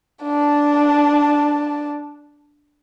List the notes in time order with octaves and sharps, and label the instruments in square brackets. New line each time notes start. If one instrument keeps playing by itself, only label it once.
[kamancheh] D4 A5